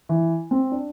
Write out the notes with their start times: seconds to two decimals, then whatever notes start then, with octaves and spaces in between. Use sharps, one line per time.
0.09 E3
0.51 C4
0.72 D4